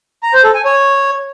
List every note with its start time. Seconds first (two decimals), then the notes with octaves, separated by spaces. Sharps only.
0.23 A#5
0.33 C5
0.44 A4
0.54 G#5
0.65 C#5